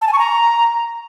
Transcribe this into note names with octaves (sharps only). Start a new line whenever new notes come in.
A5
G#5
C#6
A#5